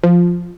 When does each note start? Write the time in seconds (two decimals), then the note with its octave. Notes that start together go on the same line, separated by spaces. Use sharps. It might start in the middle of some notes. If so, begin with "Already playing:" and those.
0.03 F3